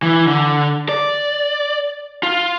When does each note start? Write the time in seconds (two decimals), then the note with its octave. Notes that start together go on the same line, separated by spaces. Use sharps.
0.03 E3
0.27 D3
0.89 D5
2.23 F4